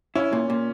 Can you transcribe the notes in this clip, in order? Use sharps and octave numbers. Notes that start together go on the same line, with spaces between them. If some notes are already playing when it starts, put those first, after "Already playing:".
C#4 E4
A#2
A#2